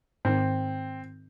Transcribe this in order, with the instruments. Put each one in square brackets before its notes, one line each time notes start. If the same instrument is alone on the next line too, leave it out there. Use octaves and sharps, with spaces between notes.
[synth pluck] G#2 D#3 [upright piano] C4